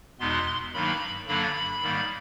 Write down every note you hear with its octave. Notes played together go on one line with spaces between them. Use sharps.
E2 B2 G#3 B3 D#4 C6
G2 D#3 F#3 A#3 D#4 B5
G2 D3 F#3 A#3 D4 B5
G#2 D#3 G3 A#3